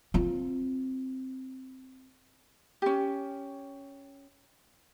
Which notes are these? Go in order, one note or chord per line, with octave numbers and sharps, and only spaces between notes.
C4 F4
C#4 G4